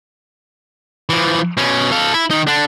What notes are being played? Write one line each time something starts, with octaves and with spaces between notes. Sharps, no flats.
E3 F3
B2 C#4
A4 F5
E4
D#3 D#4
D3 D4